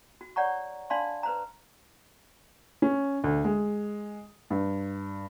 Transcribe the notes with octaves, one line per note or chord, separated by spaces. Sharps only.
F#4
C#5 D5 F#5 A#5 C#6
D4 D5 F5 A5 B5 C6
B4 C5 A#5
C#4
D2
G#3
G2